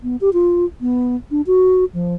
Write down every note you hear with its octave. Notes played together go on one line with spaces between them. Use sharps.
B3
G4
F4
B3
D4
F#4
F3